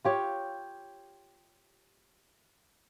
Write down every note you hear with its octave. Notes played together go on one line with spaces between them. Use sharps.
F4 G4 C#5